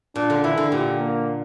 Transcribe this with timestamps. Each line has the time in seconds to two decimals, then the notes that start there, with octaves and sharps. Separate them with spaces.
0.16 A#2 D4
0.30 D3
0.44 E3 E4
0.58 D3
0.71 A#2 G4
0.99 A#3